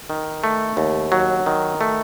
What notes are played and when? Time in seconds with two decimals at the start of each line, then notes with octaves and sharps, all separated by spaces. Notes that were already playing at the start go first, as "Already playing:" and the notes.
0.10 D#3
0.44 A3
0.77 D#2
1.12 F#3
1.46 D#3
1.81 A3